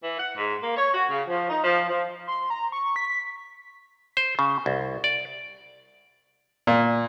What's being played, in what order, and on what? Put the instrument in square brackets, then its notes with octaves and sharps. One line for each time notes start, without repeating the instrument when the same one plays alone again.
[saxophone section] E3
F#5
G#2
A#3
C#5
F#4
C#3
F3
D#4
F3
F3
[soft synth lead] C6
A#5
C#6
B6
[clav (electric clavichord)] C5
C#3
C2
D5
[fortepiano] A#2